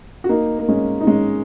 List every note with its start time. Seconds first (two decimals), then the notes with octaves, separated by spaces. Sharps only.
0.24 F#4
0.29 A#3 D#4
0.59 A#3
0.69 G#3 C#4
1.01 D#4
1.07 G#3 C#4